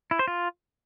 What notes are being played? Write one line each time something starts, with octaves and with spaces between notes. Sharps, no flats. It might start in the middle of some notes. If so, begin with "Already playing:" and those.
E4
C5
F4